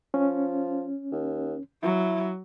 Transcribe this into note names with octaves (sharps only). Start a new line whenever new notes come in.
F3 C#4
D#2
F#3 E4